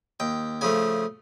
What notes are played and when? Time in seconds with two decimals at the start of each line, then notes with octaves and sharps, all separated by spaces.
0.20 D#2 G5
0.61 C#3 F3 A3 G#5